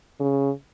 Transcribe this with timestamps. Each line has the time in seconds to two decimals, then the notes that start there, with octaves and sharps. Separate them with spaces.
0.20 C#3